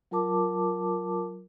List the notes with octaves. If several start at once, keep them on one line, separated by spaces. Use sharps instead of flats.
F#3 F4 A#4 A5 D6